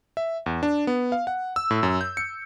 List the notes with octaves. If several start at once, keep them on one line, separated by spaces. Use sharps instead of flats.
E5
E2
D4
B3
F5
F#5
E6
A2
F#2
G6
C#7